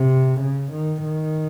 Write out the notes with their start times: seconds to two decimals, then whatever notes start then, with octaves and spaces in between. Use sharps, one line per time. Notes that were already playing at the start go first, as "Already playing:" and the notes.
Already playing: C3
0.41 C#3
0.73 D#3
1.05 D#3